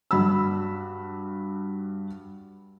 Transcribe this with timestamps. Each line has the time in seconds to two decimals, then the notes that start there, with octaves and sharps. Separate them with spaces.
0.11 G2 F#4 B5 E6